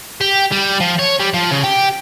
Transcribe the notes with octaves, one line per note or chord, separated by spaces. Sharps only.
G4
G3
F3
C#5
G3
F3
C#3
G4